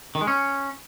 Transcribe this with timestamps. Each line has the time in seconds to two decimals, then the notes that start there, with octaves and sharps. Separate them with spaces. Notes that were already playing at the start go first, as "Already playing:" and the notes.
0.15 D#3
0.21 G#3
0.27 C#4